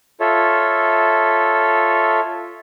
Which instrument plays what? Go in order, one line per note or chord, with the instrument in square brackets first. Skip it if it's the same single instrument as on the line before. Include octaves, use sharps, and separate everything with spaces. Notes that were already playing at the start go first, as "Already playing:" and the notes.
[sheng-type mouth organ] F4 A4 C#5 E5